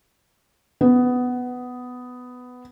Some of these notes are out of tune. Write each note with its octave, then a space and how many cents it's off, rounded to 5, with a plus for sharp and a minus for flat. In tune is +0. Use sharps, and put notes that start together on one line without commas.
B3 +10